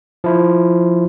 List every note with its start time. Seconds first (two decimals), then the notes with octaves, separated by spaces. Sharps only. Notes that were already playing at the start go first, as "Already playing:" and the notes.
0.24 F3 E4 C5